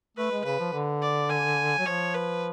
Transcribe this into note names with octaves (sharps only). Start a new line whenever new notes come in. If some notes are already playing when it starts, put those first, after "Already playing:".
A3 B4
G#3
C#3 B4
F3
D3
D5
G#5
F#3
F3 C#5
B4